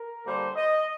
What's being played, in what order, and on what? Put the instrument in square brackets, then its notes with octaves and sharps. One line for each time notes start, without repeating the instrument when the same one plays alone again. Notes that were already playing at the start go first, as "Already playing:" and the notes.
Already playing: [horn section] A#4
D3 G3 A#3 C5
D#5